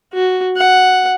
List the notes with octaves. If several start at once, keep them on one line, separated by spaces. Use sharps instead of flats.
F#4
F#5